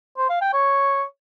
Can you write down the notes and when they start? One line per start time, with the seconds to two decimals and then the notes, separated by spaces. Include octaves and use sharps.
0.17 C5
0.29 F5
0.41 G5
0.53 C#5